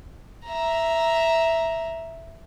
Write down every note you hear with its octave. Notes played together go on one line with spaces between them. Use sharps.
E5 A#5